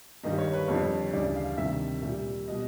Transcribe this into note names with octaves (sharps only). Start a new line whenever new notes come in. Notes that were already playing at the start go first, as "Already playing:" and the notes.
G2 D#3 G3 D#5
C#5
B4
F2 D3 G3 C#5
D2 C#3 E3 G3 D5
F5
D2 C3 D#3 G3 E5
A#2 G3 E5
B2 G3 D#5